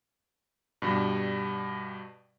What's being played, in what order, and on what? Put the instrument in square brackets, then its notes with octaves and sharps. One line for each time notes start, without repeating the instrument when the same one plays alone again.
[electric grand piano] G2 B2 G3